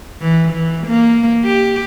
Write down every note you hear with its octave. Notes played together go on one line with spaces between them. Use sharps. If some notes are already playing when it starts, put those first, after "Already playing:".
E3
E3
A#3
G4